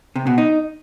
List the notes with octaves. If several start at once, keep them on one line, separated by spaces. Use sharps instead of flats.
C3
B2
D#4